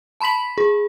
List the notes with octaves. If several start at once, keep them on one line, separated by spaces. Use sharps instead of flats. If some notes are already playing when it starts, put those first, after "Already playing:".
A5 B5 C6 B6 F#7
G#4